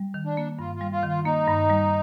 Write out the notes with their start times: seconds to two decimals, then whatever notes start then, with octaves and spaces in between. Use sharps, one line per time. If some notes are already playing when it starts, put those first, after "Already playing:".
Already playing: G3
0.14 D#3
0.25 D4
0.37 A#3
0.59 G2 F4
0.75 F4
0.81 G3
0.92 F4
1.03 D#3
1.08 F4
1.25 A#3 D#4
1.47 G2
1.70 G3